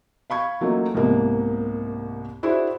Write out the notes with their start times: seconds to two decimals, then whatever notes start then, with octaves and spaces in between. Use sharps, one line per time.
0.30 F5 B5 C#6 G#6
0.61 F#3 A3 A#3 C#4 D#4 F4
0.94 C2 G#2 C3 A#3 B3
2.43 D4 E4 F#4 G#4 C5 E5